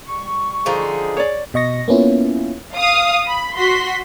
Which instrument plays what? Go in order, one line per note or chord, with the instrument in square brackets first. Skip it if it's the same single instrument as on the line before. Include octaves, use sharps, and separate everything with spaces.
[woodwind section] G3 C#6
[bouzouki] D3 F3 D#4 [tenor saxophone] G#4
[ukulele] C#5 D5
[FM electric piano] B2 D#5 C#6 A#6
A#3 B3 C#4 E4 F4
[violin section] F5 D#6
B5
F#4 C6 B6